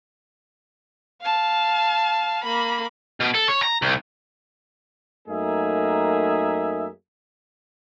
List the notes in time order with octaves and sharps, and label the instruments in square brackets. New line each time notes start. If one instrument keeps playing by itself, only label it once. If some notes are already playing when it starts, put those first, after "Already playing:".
[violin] F5 A5
A#3 B5
[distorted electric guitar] B2
A4
C#5
A#5
C2
[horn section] F#2 A3 A#3 D#4 G#4 E5